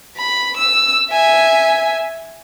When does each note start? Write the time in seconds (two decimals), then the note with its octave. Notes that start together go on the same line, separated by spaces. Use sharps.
0.17 B5
0.57 E6
1.11 E5 G#5